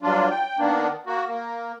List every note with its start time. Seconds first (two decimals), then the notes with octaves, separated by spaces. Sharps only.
0.02 G2 F#3 D4 F4
0.31 G5
0.58 D#3 A#3 B3 D4
1.07 A#3 F#4
1.28 A#3